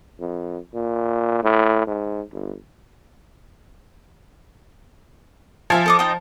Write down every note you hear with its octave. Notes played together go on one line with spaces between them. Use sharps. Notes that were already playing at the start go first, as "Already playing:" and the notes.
F2
A#2
A2
G#2
G1
F3 E5 F5 G#5
A4 D#5 D6
D#4 D#5 G5